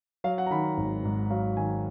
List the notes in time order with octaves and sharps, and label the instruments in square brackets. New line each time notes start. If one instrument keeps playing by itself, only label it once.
[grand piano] F#3 F5
F#5
A#5
D#3 B5
G#1
G#2
F#3 F5
D#3 G#5